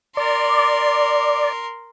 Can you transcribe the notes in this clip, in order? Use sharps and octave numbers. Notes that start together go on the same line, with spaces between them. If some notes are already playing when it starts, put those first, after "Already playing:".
A#4 D5 C6